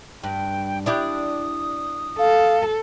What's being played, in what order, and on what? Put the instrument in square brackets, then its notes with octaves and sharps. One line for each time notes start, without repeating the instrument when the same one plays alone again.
[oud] G2 [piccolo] G5
[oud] D4 E4 G4 [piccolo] D#6
[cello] A4 [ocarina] F5